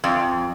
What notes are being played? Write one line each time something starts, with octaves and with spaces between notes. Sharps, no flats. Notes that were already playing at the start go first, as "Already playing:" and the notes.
F2